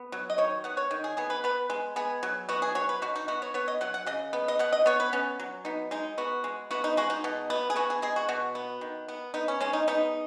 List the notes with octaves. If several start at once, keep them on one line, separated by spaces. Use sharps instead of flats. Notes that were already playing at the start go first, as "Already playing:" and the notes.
Already playing: B3
F#3
D#5
D#3 C#5
B3 F#5
C#5
D#3
G#4
B3 G#4
B4
B3 B4
G#3
B3 G#4
F#3
B3 F#4
G#4
F#3 C#5
B4
B2 F#4
D#4
B3 F#4
C#5
B3 C#5
D#5
F#3 F#5
F#5
C#3 D#5
B3
D#5
B2 F#5
D#5
B3 C#5
B4
B3 C#4
F#3
B3 D#4
G#3 D#4
B3 F#4
G#3
B3 F#4
D#4
G#3 F#4
D#4
B2
B3
G#4
B3 F#4
G#4
G#3 G#4
F#4
B2 F#4
B3
D#3
B3
B3 D#4
C#4
G#3 C#4
D#4
B3 D#4